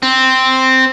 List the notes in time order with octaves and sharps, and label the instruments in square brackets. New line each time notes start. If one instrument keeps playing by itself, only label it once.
[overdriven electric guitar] C4